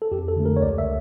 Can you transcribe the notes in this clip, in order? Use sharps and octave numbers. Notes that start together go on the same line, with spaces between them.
A4
F2 G4
A4
D3 A3
A#4
C#5
C#2 D5
E5